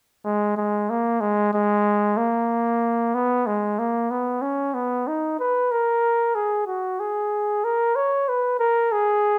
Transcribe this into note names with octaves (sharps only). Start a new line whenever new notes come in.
G#3
G#3
A#3
G#3
G#3
A#3
B3
G#3
A#3
B3
C#4
B3
D#4
B4
A#4
G#4
F#4
G#4
A#4
C#5
B4
A#4
G#4